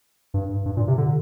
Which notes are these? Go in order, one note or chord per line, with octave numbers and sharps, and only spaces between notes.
G2
G2
A#2
C3
D3